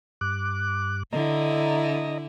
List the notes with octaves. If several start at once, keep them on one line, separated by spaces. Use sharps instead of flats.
G2 D6 F#6
D3 E4 D#5 A#5